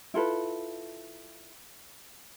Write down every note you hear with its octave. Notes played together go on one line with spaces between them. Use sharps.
E4 F4 A4 B4